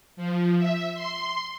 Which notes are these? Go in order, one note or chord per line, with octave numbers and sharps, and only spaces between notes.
F3
E5
C6